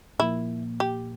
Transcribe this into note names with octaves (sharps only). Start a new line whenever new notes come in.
A#2 F3 A#3 E4
G4